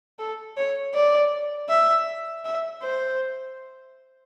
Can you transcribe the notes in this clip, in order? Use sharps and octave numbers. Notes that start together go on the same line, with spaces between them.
A4
C#5
D5
E5
E5
C5